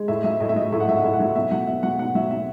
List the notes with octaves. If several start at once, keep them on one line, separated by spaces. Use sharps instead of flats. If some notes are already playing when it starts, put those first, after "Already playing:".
Already playing: G#3
A2 E5
F#3 E5
A2 D#5
E5
F#3 D#5
A2 E5
F#5
F#3 E5
F#5
A2 E5
F#5
F#3 E5
B2 E5
F#3 F#5
B2 E5
F#3 F#5
B2 F#5
F#3 E5
B2 E5